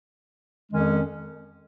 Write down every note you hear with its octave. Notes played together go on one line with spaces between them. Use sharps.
F2 D#3 G#3 C#4